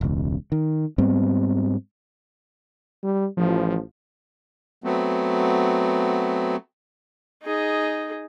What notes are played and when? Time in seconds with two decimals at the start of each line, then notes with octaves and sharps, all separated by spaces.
0.01 E1 C#2
0.52 D#3
0.98 G#2 G3 B3 C4
3.03 G3
3.37 A1 F3
4.84 F#3 A3 B3 C4
7.43 D#4 G#4